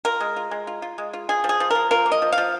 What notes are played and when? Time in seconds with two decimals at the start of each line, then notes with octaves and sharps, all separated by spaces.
0.05 F4 A#4
0.20 G#3
0.36 F4
0.51 G#3
0.67 F4
0.82 F4
0.98 G#3
1.13 F4
1.29 F3 G#4
1.44 F3
1.49 G#4
1.60 F3
1.70 F3 A#4
1.91 F4 A#4
2.06 A#3
2.12 D#5
2.22 F3
2.32 F5
2.38 F3